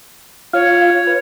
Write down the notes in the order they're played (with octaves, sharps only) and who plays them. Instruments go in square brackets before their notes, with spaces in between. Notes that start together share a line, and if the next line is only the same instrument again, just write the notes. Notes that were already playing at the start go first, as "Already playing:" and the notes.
[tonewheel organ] F4 F5 [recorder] C#5
[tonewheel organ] B4